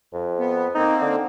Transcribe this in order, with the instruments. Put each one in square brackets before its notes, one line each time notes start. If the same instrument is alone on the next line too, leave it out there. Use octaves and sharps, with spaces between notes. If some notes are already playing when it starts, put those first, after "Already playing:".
[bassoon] F2
[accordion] B3
[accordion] A#3 C4 [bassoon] D#4
[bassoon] D3